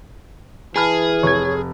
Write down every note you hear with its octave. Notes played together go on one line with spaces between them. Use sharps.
E3 G#4 A5 B5 F6
F1 C#5 G#6